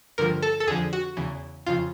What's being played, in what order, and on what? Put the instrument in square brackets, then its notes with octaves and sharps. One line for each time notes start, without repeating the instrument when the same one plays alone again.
[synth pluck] G2 D3 F3 A#4
A4
A4
F2 D3 F3 G#4
F#4
E2 C#3 E3
F2 C#3 F3 F4